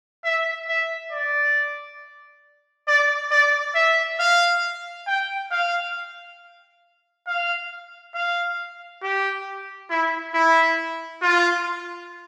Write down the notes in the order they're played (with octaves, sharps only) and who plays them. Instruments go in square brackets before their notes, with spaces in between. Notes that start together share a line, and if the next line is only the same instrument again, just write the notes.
[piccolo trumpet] E5
E5
D5
D5
D5
E5
F5
G5
F5
F5
F5
G4
E4
E4
F4